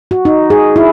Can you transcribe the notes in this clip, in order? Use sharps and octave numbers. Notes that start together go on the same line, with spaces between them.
F#4
D#4
G#4
E4